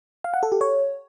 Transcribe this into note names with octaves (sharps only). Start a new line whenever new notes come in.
F5
F#5
A4
G4
C#5